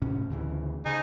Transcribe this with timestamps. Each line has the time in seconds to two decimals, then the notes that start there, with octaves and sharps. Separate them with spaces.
0.02 A2 C3 C#4
0.30 D2 C#3 E3
0.86 C#3 D#4 G#5